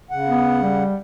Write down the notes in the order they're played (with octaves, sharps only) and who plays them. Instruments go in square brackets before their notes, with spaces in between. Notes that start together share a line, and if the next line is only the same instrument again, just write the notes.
[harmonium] C#3 F#5
[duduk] B3
G3